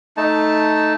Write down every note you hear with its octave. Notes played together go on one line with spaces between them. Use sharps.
A3 D#4 A5